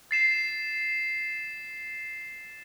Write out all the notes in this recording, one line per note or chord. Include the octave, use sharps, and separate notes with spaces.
A6 C7 E7